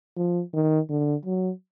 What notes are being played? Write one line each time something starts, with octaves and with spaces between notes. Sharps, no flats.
F3
D#3
D3
F#3